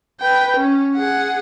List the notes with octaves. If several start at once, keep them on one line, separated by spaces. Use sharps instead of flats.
B4 G5
C#4
G#4 F#5